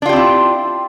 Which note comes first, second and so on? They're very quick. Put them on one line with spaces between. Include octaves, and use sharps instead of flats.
D4 F4 G4 C4 E4